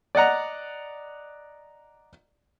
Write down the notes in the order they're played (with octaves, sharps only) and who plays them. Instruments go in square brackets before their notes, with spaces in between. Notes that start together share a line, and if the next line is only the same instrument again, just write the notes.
[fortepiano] D5 D#5 F#5 A#5